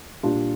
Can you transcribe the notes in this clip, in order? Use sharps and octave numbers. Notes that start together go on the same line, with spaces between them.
A#2 G3 D4 F4